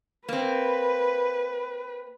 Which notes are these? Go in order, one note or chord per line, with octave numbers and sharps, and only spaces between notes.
A#3 C4 B4